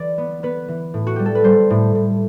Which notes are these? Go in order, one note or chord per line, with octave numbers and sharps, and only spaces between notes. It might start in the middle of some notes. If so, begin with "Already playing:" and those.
Already playing: E3 D5
B3
B3 B4
E3
A2
F#4
G3 G4
A4
B4
G3 C5
A2
A2